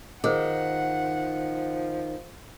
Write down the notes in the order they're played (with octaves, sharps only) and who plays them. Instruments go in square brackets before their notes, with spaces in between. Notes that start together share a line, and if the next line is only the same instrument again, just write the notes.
[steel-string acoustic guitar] D#3 [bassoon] F3 [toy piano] G#4 A#4 C5 [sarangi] F#5